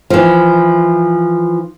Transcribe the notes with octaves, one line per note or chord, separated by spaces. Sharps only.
E3 F3